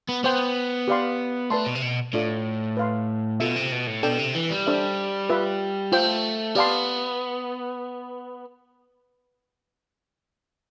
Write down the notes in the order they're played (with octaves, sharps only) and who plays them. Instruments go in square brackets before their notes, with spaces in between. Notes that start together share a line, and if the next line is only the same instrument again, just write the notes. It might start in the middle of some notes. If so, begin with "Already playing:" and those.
[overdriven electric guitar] B3
[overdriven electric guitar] B3 [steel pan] C5 G5 C6
[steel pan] G4 B4 D5 F5 C6
[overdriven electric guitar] A3 [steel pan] B4 D5 A5 C6
[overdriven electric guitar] B2
C3
B2
[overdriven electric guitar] A2 [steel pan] D4 F4 A4 D5
[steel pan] B4 F5 C6
[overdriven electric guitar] B2 [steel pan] F4 A4 E5
[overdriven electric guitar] C3
B2
A2
[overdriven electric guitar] B2 [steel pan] D4 A4 D5 G5
[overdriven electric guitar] C3
E3
G3
[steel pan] D4 A4 C5 E5
F4 B4 E5
[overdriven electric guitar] A3 [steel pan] F4 C5 G5
[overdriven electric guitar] B3 [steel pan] G4 D5 F5 A5 C6